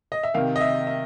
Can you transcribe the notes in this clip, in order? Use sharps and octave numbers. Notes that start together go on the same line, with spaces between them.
D#5
E5
C3 D#3 F5
D#5
E5
E5